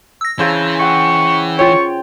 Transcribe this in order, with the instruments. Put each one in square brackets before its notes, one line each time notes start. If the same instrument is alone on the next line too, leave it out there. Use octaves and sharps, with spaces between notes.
[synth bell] E6 A#6
[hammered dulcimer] C#3 C5 A5 [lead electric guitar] E3
[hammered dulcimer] F#5 G5 [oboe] C#6
[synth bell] F4 C#5 [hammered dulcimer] G5 [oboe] C#6